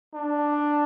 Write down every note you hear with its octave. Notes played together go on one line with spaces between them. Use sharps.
D4